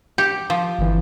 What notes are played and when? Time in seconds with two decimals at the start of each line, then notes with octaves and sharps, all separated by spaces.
0.18 G4
0.50 F3
0.78 G1 E3